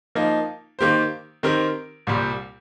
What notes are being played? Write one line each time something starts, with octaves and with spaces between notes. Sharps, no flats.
F3 A#3 D#4
D#3 A#3 G4 C5
D#3 C4 G4 A#4
C2 A#2 G3